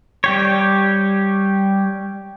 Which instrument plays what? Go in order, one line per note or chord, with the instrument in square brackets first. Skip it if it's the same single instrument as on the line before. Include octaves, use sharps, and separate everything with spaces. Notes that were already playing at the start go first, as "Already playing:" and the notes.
[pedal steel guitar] G3 G4 C#5